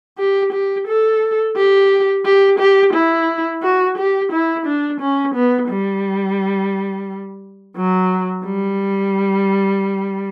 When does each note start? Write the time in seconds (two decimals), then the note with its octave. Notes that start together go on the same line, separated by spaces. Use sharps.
0.18 G4
0.52 G4
0.87 A4
1.56 G4
2.25 G4
2.59 G4
2.93 E4
3.63 F#4
3.97 G4
4.32 E4
4.66 D4
5.01 C#4
5.35 B3
5.69 G3
7.76 F#3
8.45 G3